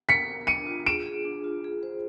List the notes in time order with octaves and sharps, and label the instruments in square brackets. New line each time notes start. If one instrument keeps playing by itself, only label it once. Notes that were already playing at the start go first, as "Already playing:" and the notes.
[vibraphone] A#4 [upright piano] B6 C#7
[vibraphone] A#4
[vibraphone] D4 [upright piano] C#7 D#7
[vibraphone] F4
[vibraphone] G#4 [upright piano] D7 E7
[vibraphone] G#4
D4
F4
G#4
C5